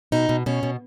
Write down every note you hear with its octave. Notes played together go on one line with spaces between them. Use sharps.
B2 D#4
B2
B2 C#4
B2